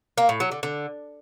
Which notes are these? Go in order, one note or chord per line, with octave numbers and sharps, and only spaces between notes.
A#3
A2
F#3
D3
D3